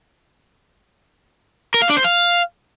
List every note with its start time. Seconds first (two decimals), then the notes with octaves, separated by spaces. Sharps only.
1.74 A#4
1.82 F5
1.89 D4
1.97 C5
2.04 F5